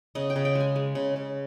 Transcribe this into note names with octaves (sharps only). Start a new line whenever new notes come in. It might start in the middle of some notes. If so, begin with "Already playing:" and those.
C#3 D#5
G5
C#3
G5
G#3
G#5
G#3
C#3
C#3